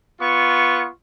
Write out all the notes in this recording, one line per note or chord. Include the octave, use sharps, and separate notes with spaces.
B3 F4 C#6